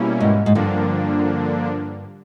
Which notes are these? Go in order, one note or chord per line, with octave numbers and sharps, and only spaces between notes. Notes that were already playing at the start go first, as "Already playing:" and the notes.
Already playing: B2 G3 A#3 C#4 E4
G#2
G#2
G2 D3 F3 A#3 D4